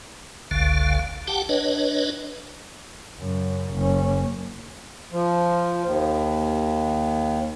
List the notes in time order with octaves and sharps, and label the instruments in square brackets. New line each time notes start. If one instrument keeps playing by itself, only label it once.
[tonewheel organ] G1 C#2 D3 F5
G4 F#5 G5 A5
D4 B4 C#5 D#5
[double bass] F#2 C#3
F#1 C#4
[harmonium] F3
D#2